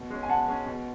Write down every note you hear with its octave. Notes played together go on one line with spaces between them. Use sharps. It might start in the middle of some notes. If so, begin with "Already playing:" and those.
Already playing: B2
G#3 C#4
G#5
B2 F#5 A5
G#3 C#4
B2